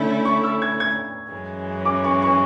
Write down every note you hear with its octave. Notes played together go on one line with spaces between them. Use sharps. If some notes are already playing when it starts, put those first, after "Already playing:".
Already playing: D3 A3 C#4 E4
C#6
E6
G#6
G#6
F#2 E3 G#3 C#4
D6
C#6
C#6